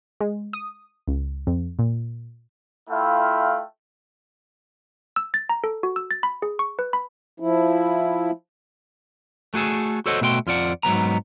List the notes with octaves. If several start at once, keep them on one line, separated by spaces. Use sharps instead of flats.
G#3
D#6
C#2
F2
A#2
A3 E4 F4 F5 G5
E6
A6
A#5
A4
F#4
E6
A6
B5
G#4
C#6
B4
B5
F3 E4
A3 F#4 G#4 A4
F#4 A4 C5 C#5 D#5 F#5
B2 A3 F#4 G5 C6
F2 F4 D5 F#5
G#2 F#3 B3 A#5